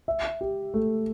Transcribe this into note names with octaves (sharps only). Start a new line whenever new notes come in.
E5
G4
A3